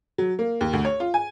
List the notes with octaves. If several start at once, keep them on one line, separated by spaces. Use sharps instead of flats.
F#3
A#3
D#2
D2
C#5
F4
G#5